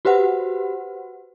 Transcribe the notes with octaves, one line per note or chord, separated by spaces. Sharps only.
F#4 G4 B4 C5 F#5